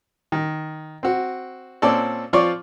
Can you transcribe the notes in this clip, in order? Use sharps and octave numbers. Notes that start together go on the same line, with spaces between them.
D#3
C4 F#4
A#2 C4 C#4 A4 D5
F3 C4 F4 C#5 D5